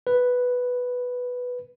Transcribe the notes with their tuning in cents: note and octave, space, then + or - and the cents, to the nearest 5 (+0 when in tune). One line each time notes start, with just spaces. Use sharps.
B4 +0